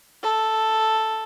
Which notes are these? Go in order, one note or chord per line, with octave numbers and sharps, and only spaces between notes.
A4